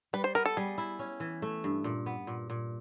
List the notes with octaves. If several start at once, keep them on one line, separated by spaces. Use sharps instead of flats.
G3 B4
C5
B3 A#4
A4
G3 G#4
E4
C#4
E3
A3
G2
A#2
B3
A#2
A#2